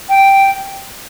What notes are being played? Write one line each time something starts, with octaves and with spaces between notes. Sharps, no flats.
G5